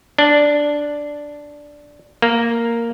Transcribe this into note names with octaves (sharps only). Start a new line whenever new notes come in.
D4
A#3